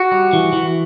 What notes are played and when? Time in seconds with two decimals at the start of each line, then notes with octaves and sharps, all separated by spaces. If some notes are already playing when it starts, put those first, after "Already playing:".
Already playing: F#4
0.12 G3
0.33 E3
0.53 E3